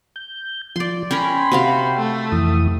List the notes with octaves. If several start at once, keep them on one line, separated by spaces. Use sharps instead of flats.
G6
F3 D5 C6
C#4 A#4 G5 B5 C6
C3 F#4 F5
A3
F2 E3 D#6